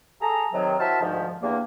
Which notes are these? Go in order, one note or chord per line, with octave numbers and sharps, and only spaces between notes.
G#4 A4 A#5
C3 D#3 F#3
E4 F#4 A#4 C5 E5 A5
D2 G#2 D#3 F3
E2 G2 A#3